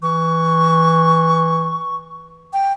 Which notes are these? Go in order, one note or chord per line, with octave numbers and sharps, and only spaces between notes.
E3 C#6
G5